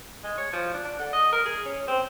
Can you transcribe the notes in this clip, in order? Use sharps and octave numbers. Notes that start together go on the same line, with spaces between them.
G#3
C#5
F3
D4
D4
D3
D#5
A#4
G#4
C#4
C4